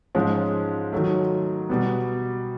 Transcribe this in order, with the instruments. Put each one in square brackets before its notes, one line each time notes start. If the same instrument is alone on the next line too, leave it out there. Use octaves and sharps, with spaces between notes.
[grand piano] G#2 F3 G#3 C#4
D#3 F#3 A3
B2 G3 B3